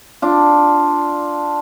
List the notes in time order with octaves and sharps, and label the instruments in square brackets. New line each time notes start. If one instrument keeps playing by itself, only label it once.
[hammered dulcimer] D4 F4